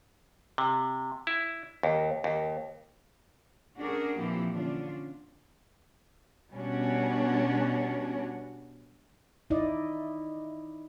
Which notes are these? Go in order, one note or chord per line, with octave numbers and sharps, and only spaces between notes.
C3
E4
D#2
D#2
C#4 D4 F#4 G#4 A#4 D5
A#2 E3 F3 A#3 C4 G4
D3 C#4 D4 F4
B2 G3 C#4 D4 F#4
D#4 E4 D5 D#5